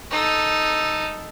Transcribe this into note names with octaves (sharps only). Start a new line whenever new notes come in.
D#4 A4